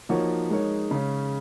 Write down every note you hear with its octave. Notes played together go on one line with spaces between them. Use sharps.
F3 A#3 D#4 F#4 C#5
G#3 D#4 A#4 C#5
C#3 G#3 C#4